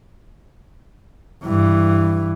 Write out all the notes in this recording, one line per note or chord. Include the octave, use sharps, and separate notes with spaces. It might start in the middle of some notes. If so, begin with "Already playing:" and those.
G2 E3